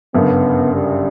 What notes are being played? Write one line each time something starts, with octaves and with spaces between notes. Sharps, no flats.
G1 F#2 C#3 B3
G3